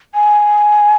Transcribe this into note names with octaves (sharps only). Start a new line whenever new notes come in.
G#5